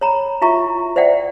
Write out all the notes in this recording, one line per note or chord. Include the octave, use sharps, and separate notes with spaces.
C#5 A#5 B5
E4 F4 E5 A#5 C#6
C5 D5 E5 F#5 G5